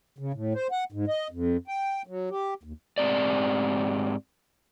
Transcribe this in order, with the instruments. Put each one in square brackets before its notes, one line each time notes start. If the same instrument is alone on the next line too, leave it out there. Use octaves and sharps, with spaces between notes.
[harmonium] C#3
A2
C5
F#5
G#2
D#5
F2
G5
F#3
G4
D#2
[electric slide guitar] G#2 C4 G4 D5